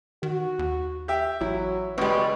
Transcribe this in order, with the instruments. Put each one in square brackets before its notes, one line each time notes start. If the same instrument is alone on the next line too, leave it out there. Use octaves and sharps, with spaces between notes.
[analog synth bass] D#3 [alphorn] F#4
[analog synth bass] D#2
[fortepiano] G4 E5 G5
[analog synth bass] A1 [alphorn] F#3 [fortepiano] E4
[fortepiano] C#2 G#3 [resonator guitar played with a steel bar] B2 G3 [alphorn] B4